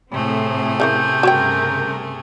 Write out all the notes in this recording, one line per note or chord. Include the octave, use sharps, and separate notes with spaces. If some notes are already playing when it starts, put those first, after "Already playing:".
A2 C3 A3 C4 G#4
C#3 E3 A#4 G6
G2 C#3 F#4 A#4 C#5 G5